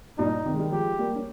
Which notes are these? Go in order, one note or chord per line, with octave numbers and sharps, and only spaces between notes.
G2 A#2 D#4
C3 D#3
G#3
D#3 G3
F3 G#3 G4
G3 A#3
C#4